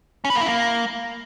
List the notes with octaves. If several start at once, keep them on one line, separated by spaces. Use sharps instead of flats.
C#4
B4
A#3
E4
A#3